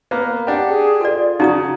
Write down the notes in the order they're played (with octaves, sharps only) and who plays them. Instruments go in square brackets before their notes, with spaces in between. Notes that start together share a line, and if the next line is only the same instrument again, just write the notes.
[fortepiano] A#3 B3
[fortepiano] D4 G4 [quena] F#5
[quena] G#4
[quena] F4 [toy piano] A4 D5
[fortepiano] C#3 [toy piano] D#4 A#5 D#6 [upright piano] F#4